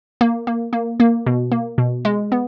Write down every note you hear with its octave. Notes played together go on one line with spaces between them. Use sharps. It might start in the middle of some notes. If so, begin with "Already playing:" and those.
A#3
A#3
A#3
A#3
B2
A#3
B2
G#3
B3